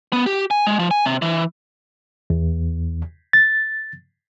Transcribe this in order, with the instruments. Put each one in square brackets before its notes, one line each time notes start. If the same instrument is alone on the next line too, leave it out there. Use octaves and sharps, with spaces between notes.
[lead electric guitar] B3
G4
G#5
G#3
F3
G#5
C3
E3
[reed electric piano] E2
A6